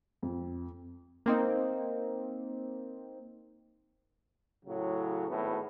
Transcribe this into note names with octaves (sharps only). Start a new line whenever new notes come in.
F2
A#3 C4 D#4
A2 C#3 F#3
G#1 A2 B3